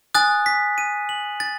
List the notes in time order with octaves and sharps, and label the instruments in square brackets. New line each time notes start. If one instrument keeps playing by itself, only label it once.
[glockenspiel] G#5 D#6 F#6 A6
B6
D#7
F#7
A6